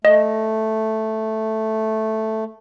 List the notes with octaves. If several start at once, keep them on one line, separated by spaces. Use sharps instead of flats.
A3 D#5